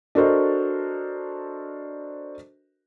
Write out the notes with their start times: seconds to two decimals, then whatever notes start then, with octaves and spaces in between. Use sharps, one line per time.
0.15 D4 F#4 A4 A#4 C5 D#5